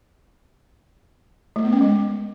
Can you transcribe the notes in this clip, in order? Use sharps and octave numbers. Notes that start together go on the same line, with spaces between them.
A3
B3
C#4
G#3